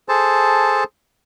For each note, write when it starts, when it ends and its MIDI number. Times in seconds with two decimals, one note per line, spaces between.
0.09 0.84 68
0.09 0.84 69
0.09 0.84 72
0.09 0.84 81